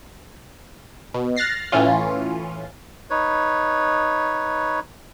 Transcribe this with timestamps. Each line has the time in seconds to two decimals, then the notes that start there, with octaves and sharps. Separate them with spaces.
1.14 B2
1.37 F6 F#6 A6 A#6 C7
1.72 A2 E3 C#4 F4
3.10 D#4 B4 C#5